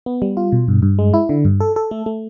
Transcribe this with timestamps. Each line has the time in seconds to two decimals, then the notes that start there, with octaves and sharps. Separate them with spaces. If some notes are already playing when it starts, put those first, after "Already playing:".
0.06 B3
0.22 G3
0.37 F4
0.52 B2
0.68 G2
0.82 G2
0.99 G#3
1.14 E4
1.29 D3
1.45 G2
1.60 A4
1.76 A4
1.91 A3
2.06 A3